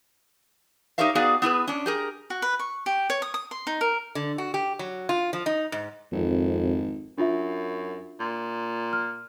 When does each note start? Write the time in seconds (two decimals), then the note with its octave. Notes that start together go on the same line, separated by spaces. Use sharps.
0.98 D#4 G4 A#4 C#5 E5 F5
1.15 B3 D#4 F#4 G#4 D5 F5
1.42 B3 E4 G#4 B4
1.67 C#4 D4
1.86 G4 G#4 A#4
2.30 F#4
2.42 B4
2.59 C#6
2.86 G4
3.10 C#5
3.22 D#6
3.34 D#6
3.51 C6
3.67 D#4
3.81 A#4
4.15 D3
4.38 F#4
4.54 G4
4.79 F#3
5.09 F4
5.33 F3
5.46 D#4
5.72 G#2
6.12 G#1 F2
7.18 F#2 D4 F4 E5
8.20 A#2
8.93 F6